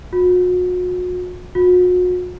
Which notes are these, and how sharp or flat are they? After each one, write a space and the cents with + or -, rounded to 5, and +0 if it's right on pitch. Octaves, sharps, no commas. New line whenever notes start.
F#4 -40
F#4 -40